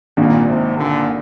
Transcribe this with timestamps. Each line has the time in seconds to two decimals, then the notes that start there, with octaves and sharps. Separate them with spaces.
0.17 G#1 G2 A#2 D#3 A#3
0.47 G#2 C3
0.77 A#2 D3